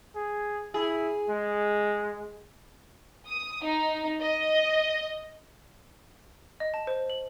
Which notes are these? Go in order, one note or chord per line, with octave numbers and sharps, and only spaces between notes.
G#4
E4 G#4
G#3
D#6
D#4
D#5
D#5
A5
C5
F#7